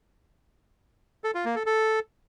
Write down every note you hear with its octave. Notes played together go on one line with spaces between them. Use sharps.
A4
F4
A#3
A4
A4